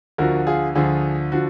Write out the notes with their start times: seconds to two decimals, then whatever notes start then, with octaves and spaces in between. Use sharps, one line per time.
0.18 D2 D3 F3 F#4 A#4
0.47 F4 G#4
0.75 D2 D3 F3 F4 G#4
1.32 D3 F3 F#4